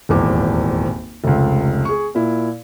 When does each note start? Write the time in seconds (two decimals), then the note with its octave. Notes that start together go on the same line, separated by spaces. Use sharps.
0.09 D#1 G#1 E2 D6
1.24 F1 C#2
1.85 G#4 C#6
2.15 A#2 E4